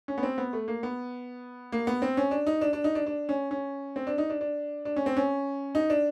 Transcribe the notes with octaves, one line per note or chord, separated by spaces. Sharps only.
C#4
B3
C4
B3
A3
A#3
B3
A#3
B3
C4
C#4
D4
D#4
D4
D4
D#4
D4
D4
C#4
C#4
C4
D4
D#4
D4
D4
D4
C#4
C4
C#4
D#4
D4